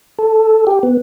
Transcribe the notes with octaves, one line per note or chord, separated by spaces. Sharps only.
A4
G4
B3